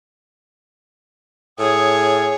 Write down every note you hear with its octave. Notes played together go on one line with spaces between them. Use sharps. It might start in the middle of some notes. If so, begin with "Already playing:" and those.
A2 G#4 C#5 D#6